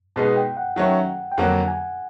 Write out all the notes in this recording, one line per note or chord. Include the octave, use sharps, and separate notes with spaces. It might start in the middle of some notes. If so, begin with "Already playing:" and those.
B2 G#3 B3 D#4 A5
G5
F#5
D#3 F#3 A3 C#4 F#5
G5
F2 D3 F#3 A#3 F#5
G#5